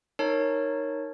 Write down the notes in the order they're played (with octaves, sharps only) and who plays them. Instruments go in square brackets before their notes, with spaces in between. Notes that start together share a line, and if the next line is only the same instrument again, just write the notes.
[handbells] D#4 A#4 C#5 A5